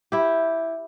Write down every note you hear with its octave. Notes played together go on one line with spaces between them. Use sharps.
E4 G4